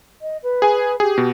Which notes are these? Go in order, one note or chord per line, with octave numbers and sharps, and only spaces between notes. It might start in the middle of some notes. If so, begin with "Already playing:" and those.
D#5
B4
G#4 G#5
G4 G#4
B2